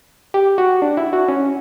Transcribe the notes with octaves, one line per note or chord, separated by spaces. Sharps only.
G4
F#4
D4
E4
F#4
C#4